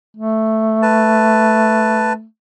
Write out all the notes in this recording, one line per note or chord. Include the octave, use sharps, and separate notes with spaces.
A3
B4 A5